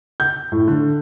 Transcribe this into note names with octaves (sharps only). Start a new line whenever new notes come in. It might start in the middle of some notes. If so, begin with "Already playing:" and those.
G6
A2
D3